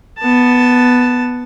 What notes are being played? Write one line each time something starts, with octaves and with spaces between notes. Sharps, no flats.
B3 A5